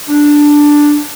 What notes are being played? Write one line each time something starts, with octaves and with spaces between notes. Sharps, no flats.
D4